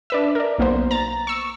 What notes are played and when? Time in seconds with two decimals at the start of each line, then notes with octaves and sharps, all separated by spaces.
0.10 D4 B4 E5
0.35 A#4 D5
0.58 B1 A#3 B3 C5
0.91 A#5 A6
1.27 C#6 E6